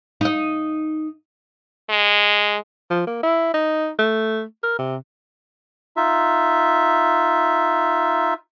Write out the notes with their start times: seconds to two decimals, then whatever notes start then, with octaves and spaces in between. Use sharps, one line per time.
0.21 D#4 D#5
1.90 G#3
2.91 F3
3.07 A#3
3.23 E4
3.54 D#4
3.99 A3
4.63 A#4
4.79 C3
5.97 D#4 F4 E5